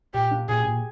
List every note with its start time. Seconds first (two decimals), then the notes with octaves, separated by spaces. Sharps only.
0.14 A#2 G4
0.31 D4
0.48 A#2 G#4
0.66 A#2